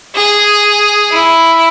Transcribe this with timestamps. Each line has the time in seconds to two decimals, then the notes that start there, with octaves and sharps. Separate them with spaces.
0.15 G#4
1.12 E4